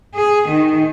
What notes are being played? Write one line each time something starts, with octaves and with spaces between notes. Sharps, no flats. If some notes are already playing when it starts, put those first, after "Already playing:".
G#4
D#3